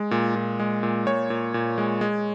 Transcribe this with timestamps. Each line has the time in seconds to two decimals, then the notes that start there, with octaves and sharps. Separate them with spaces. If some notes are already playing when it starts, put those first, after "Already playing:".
Already playing: G#3
0.11 A#2
0.36 A#2
0.60 G#3
0.83 A#2
1.06 A#2 C#5
1.30 A#2
1.54 A#2
1.78 G#3
2.01 G#3